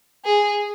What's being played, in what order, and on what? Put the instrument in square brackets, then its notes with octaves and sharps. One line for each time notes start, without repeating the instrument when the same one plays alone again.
[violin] G#4